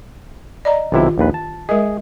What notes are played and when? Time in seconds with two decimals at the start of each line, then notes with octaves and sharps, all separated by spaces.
0.65 D5 D#5 A#5
0.92 B1 C3 D#3 E4 F4 G4
1.18 A#1 D#2 B4
1.34 A5
1.69 G#3 G#4 A#4 D#5